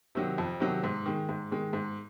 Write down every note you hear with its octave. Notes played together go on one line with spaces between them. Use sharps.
C3 D#3 F#3
F2
C3 D#3 F#3
G#2
D#3 G#3
G#2
D#3 G#3
G#2